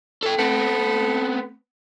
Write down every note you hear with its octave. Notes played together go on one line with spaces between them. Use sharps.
A4 G5
A3 B3 C4